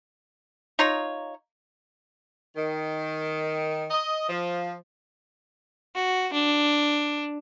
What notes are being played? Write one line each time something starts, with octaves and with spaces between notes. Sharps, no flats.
D#4 F4 C#5 A#5
D#3
D#5
F3
F#4
D4